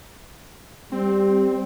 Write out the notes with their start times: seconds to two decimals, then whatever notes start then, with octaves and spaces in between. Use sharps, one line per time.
0.92 G3 C4